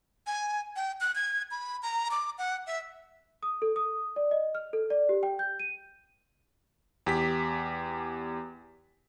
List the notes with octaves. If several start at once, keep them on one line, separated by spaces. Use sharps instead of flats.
G#5
G5
F#6
G#6
B5
A#5
D6
F#5
E5
D#6
A4
D#6
D5
D#5
F6
A4
D5
G4
G5
G6
D#7
E2 G4 B6